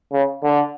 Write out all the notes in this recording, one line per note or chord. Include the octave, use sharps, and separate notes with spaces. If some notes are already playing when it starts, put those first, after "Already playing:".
C#3
D3